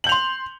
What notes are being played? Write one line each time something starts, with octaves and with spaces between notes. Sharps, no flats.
C6 G6 F7 F#7